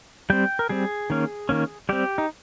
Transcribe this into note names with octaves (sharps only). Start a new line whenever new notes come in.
G3 C4 G5
A#4
G3 C4 G#4
D#3 A#3 C#4
D#3 A#3 C#4
G3 C4 G4
D#4